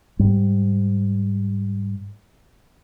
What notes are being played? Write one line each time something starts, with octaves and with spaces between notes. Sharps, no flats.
G#2 G3